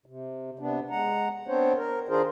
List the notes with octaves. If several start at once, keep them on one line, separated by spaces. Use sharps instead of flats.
C3
C3 B3 D4
G#3 F#5 A#5
B3 C4 D4 C5 C#5
A#4
D#3 D4 F4 G#4 A#4 C5